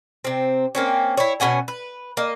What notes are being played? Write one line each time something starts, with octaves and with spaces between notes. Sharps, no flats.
C3 C4
A#3 C4 C#4
E4 C#5
B2 C#4 F#5 G#5
B4
A#3 D#5